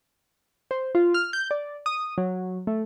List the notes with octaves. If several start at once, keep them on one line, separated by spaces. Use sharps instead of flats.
C5
F4
F6
G6
D5
D#6
F#3
A3